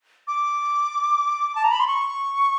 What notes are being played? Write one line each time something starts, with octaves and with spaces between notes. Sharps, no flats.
D6
A5
A#5
B5
C6
C#6